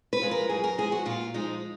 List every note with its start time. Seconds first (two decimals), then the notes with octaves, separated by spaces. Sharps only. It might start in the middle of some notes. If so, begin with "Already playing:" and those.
0.13 B4
0.22 F3 G#3
0.31 A#4
0.49 F#2 G#4
0.64 A#4
0.78 F3 G#3 G#4
0.92 F#4
1.06 A#2 F4
1.34 F3 G#3 D#4